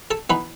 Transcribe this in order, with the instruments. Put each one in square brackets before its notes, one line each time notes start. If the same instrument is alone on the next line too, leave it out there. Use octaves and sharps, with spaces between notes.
[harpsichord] A4 A5
E3 B3 D#4 B4 B5